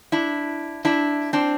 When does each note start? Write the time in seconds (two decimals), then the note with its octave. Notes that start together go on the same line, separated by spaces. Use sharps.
0.12 D4 E4
0.85 D4 E4
1.33 C4 D4